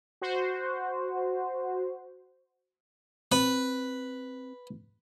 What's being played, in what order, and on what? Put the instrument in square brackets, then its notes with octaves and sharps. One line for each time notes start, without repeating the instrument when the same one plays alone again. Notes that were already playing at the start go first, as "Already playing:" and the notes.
[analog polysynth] F#4 C5
[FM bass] C4 [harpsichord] B4